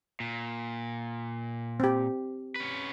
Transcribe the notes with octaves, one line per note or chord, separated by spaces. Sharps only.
A#2
C4 G4
C#4 B4